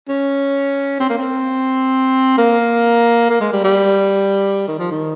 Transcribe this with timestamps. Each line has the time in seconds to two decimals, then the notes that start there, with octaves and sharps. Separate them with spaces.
0.09 C#4
1.00 C4
1.10 A#3
1.18 C4
2.38 A#3
3.30 A#3
3.41 G#3
3.53 G3
3.64 G3
4.68 D#3
4.79 F3
4.91 D#3